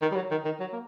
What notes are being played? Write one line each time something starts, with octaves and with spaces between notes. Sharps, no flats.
D#3
G3
F#3
D#3
D#3
F#3
A#3